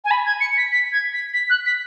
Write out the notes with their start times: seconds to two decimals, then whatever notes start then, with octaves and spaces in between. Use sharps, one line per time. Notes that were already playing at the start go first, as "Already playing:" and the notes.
0.05 G#5
0.11 B5
0.25 G#6
0.41 C#7
0.57 B6
0.72 B6
0.92 G#6
1.13 B6
1.34 B6
1.50 F#6
1.66 B6